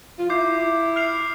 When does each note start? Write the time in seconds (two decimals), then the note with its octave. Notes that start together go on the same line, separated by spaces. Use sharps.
0.19 F4
0.30 E4 D6 G6 C7
0.96 F6 C7 F7